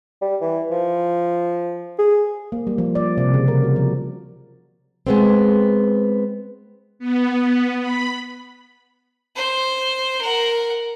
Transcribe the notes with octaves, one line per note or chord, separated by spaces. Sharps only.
G3
E3
F3
G#4
A#3
G3
F3
D5
C3
C#3
A#4
F#4
F3
G#3 B3 C4
B3
B5
C5
A#4 F#5